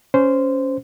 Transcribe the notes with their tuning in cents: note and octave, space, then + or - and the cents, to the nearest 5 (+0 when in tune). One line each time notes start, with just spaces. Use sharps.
C#4 +5 C5 -15